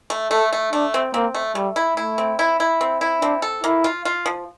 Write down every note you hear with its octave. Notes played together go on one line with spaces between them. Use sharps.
A3
A3 A4
A3
A3 D4
C4
A#3 C4
A3
G3 A3
E4
A3 E4
C4
E4
E4
C4
E4
C4 D4
A4
A#3 E4
F4
F4
F3